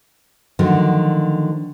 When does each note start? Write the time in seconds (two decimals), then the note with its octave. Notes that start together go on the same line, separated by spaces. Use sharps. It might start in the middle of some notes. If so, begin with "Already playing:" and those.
0.59 D3 D#3 F3 F#3 A3